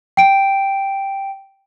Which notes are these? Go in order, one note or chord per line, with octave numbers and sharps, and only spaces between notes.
G5 D7